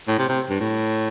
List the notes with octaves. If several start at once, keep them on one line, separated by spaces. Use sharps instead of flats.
A2
C3
C3
G2
A2